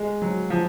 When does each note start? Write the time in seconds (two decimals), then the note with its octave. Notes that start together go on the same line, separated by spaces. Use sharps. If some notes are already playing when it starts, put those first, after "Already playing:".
Already playing: G#3
0.22 F#3
0.50 F3